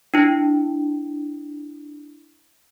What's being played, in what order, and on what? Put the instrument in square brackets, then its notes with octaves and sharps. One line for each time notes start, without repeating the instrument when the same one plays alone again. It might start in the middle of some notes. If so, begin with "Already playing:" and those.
[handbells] D4 E4